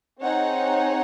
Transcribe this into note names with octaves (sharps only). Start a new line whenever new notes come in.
C4 D#4 G#4 C#5 F#5